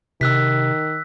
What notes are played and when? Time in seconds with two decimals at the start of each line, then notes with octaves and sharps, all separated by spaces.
0.21 C3 D#3 E6 F#6 B6